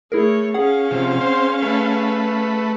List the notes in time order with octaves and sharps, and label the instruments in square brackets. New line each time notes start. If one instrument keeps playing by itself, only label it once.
[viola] A3 C#5 [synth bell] E4 G#4 A#4
[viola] C#4 F5 [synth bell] G#4 F#5
[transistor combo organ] C3 F3
C4 C5
A3 B4